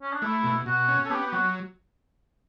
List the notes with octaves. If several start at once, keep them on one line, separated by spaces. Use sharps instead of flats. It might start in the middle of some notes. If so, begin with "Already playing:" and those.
C#4
D4
A3 E4
B2
B2 F#4
C#4
A4
B3 G4
G4
F#3 F#4